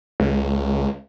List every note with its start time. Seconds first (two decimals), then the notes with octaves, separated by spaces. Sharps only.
0.20 C#2